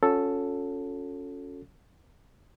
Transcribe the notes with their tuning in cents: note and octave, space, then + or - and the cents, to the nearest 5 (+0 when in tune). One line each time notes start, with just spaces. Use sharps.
C#4 +5 F#4 -45 A4 +0